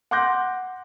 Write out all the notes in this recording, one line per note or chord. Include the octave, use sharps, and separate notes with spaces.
F#5 C6 D6 F#6 G6 A#6